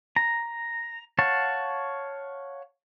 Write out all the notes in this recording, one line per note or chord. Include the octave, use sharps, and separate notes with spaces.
A#5
C#5 F5 F#5 A5